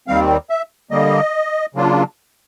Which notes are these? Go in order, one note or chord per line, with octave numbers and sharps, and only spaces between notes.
D#2 D#3 G3 C4 F5
E5
D3 G3 A#3 D#5
C#3 F#3 A#3 D4 F4